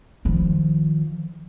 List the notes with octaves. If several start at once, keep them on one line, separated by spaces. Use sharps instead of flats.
D#3 F3